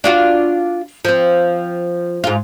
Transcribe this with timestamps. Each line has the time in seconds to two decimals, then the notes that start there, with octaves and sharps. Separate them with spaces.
0.04 D4 F4 F#4
1.05 F3 C4
2.24 G#2 F4